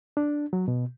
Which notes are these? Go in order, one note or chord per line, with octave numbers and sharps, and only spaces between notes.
D4
F#3
B2